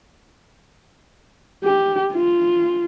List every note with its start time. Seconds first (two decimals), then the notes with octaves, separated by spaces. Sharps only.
1.64 G4
2.12 F4